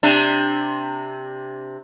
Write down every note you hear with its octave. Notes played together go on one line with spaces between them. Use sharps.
C3 D4